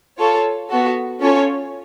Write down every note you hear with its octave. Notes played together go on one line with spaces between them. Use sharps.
F4 A4 C#5
B3 F#4 A4
C#4 F4 A4 C#5